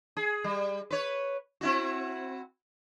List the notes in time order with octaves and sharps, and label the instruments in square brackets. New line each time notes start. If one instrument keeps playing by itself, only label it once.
[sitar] G#4
G3
B4 C#5
C4 E4 F#4